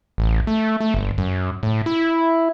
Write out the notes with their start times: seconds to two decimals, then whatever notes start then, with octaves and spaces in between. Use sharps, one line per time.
0.18 A1
0.47 A3
0.81 A3
0.94 G1
1.18 F#2
1.63 A2
1.86 E4